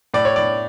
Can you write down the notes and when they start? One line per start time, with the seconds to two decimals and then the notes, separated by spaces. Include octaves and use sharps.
0.14 A2 D5
0.25 C#5
0.36 A2 D5